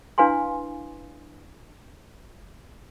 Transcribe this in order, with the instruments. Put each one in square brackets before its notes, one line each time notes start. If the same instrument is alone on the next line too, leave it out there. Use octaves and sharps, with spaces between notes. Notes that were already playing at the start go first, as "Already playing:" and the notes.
[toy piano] D4 E4 B4 F5 G#5 C6